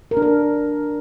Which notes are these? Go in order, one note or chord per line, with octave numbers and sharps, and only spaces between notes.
A#4
D4
A#4